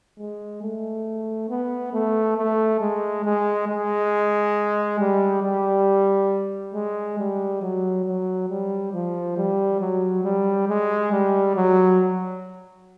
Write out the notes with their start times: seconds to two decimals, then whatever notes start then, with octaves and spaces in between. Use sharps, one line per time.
0.18 G#3
0.62 A3
1.50 B3
1.93 A3
2.37 A3
2.81 G#3
3.25 G#3
3.69 G#3
4.99 G3
5.43 G3
6.75 G#3
7.19 G3
7.62 F#3
8.05 F#3
8.49 G3
8.93 F3
9.37 G3
9.80 F#3
10.24 G3
10.68 G#3
11.12 G3
11.55 F#3